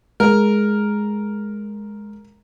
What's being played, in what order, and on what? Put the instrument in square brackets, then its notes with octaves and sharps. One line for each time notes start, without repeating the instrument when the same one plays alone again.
[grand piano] G#3 [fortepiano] A#4